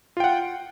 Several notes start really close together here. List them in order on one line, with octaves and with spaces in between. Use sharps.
F4 G5 F#5